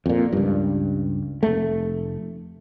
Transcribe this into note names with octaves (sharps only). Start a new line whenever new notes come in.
F2 A#2
C#2 G2
F1 A3